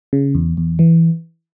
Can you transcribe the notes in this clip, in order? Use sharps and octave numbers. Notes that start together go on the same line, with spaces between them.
C#3
E2
E2
E3